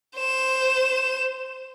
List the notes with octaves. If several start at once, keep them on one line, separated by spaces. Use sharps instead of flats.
C5 E7